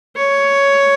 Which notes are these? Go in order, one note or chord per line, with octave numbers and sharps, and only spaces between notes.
C#5